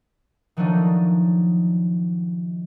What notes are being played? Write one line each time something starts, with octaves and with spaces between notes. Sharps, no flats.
D#3 F3 F#3 A3 D4 D#4